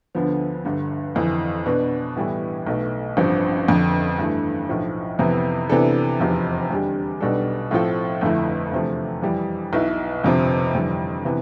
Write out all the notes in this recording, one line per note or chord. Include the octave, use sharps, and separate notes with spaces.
D2 D3 F3 B3
G1 G2 D3
G1 F2 E3
B2 B3 D4
A2 E3 G3 B3 E4
B1 B2 A3
A1 G2 F3 C4
G1 F2 D3
G2 E3 A3
B1 A2 F3
F2 C3 E3 B3 E4
C3 E3 B3 D4 A4
F1 E2 C3 F3
E2 D3 G3 D4 G4
B1 B2 G3 D4 A4
A2 F3 C4 F4 A4
G1 F2 D3 A3 E4
E2 C3 F3 A3
F2 E3 G3
B1 B2 B3 E4
G1 F2 C3 F3 C4
G1 F2 E3 G3
C3 E3 B3